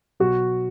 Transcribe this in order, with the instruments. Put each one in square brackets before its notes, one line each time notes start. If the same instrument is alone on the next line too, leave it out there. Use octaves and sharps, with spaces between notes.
[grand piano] B2 F#3 F#4